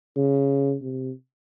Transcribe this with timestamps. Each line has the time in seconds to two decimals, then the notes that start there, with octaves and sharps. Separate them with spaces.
0.17 C#3
0.82 C3